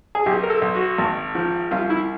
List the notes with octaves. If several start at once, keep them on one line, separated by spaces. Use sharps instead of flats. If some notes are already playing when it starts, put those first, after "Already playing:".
G#4
B1 G4
A#4
A4
B1
F#4
G#1
F3
C2 F4
E4